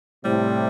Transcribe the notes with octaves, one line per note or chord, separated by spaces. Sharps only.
A2 C3 G3